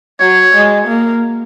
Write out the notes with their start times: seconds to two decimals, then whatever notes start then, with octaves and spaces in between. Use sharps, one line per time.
0.20 F#3 C#5
0.54 G#3
0.87 A#3